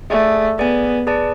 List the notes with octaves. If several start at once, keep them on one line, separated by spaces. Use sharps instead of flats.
A3 G#4 D5 G#5
B3 G#4 D5 G#5
G#4 B4 D5 A5